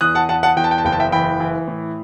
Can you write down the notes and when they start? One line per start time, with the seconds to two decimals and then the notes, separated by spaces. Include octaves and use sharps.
0.01 E2 D#6 F#6
0.15 F#5 A5
0.29 E2 F#5 A5
0.43 F#5 A5
0.57 E2 G5
0.64 A5
0.71 G5
0.78 A5
0.84 F#1 G5
0.92 A5
1.00 E5 G5
1.12 E3 G5 B5
1.40 E3
1.68 A2